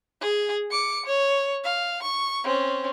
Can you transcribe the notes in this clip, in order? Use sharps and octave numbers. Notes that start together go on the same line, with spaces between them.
G#4
D6 C#7
C#5
F5
C#6
C4 C#4